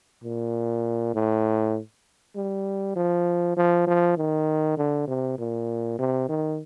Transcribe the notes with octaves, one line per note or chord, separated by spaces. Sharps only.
A#2
A2
G3
F3
F3
F3
D#3
D3
C3
A#2
C3
D#3